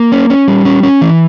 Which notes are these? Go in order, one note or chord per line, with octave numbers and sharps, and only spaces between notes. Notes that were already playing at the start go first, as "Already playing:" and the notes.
Already playing: A#3
C#4
C#4
G3
C#4
C#4
E3